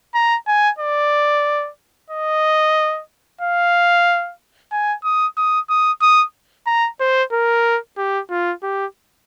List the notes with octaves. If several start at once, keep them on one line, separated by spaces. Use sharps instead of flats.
A#5
G#5
D5
D#5
F5
G#5
D#6
D#6
D#6
D#6
A#5
C5
A#4
G4
F4
G4